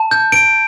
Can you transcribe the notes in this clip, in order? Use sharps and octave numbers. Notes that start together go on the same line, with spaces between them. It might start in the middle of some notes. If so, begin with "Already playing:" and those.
Already playing: A5
G6
D7